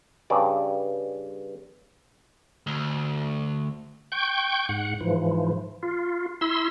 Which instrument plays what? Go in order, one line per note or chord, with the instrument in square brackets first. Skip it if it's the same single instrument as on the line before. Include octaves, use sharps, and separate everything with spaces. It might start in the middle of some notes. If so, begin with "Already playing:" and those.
[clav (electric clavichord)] G2 C#3 D5
[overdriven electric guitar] D2
[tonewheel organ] G5 C#6 G6
G#2 F#5
G#2 E3 F3
F4
E4 C6 E6